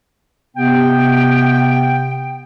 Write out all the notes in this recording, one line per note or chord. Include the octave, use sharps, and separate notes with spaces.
C3 B3 G5